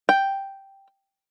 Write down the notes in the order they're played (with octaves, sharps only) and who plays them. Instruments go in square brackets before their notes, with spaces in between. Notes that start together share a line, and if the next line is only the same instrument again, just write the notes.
[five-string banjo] G5